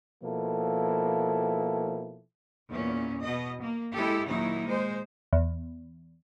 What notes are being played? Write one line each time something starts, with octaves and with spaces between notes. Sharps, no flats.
B2 F3 A#3 E4 A4
E2 A#2 C#4
B2 D#5
A#3
G#3 E4 G4 A4
D#2 A#2 F#3 D#4 E4
G#3 C5
E2